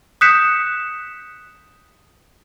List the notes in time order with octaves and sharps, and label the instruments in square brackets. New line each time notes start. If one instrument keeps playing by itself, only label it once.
[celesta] D#6 F#6 G6 B6 C#7 E7